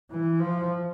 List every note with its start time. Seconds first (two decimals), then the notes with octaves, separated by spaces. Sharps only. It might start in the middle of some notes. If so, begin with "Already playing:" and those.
0.11 E3
0.39 F3